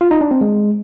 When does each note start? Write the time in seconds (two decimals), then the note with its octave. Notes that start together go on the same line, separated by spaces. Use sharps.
0.01 F4
0.11 D#4
0.21 D4
0.31 C4
0.41 G#3